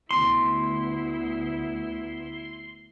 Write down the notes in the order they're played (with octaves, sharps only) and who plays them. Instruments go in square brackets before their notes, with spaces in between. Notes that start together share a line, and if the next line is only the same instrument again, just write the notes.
[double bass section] D2 B3 [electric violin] E4 [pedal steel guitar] C6